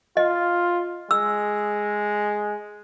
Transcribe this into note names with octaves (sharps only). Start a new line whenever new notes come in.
F4 D#5
G#3 E6